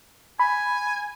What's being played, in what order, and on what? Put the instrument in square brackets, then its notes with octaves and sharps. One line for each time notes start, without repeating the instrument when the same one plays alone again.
[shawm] G#5 [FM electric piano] B5